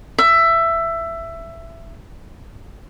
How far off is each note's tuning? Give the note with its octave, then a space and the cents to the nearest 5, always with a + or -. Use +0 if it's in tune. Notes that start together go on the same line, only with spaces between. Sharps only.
E5 +15